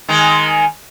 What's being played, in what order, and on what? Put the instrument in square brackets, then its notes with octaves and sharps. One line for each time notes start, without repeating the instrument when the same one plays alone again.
[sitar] D#3 G#3 A#4